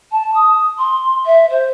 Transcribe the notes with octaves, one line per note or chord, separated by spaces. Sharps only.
A5
D#6
C6
E5
C5